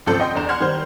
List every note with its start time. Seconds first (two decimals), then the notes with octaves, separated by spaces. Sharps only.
0.06 G#1 C#2 F3 A4 C5 G6
0.20 D#5 G5 C6
0.35 E2 D4 A#5 E7
0.49 F#5 C6 F6 G#6
0.60 D#3 G3 C5